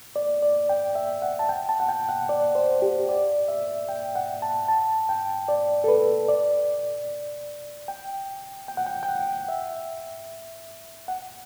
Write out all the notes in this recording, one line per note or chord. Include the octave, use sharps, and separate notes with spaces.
D5
D5
G5
E5
F#5
A5
G5
A5
F#5
G5
F#5
D5
C5
G4
D5
E5
G5
F#5
A5
A5
G5
D5
A4
B4
D5
G5
G5
F#5
G5
G5
F#5
E5
F#5